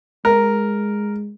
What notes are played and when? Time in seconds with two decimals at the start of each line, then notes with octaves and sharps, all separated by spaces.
0.25 G#3 A#4